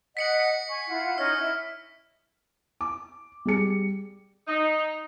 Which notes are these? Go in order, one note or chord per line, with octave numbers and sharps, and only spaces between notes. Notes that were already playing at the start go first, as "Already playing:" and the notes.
D#5 F#5 B6 C#7 F#7
G#5 C#6
E4 F4 F#5
C#4 D#4 D#5 F6
E4
D6
G3 G#4 C#7
D#4